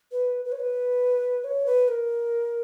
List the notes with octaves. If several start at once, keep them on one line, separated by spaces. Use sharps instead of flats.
B4
B4
C#5
B4
C#5
B4
A#4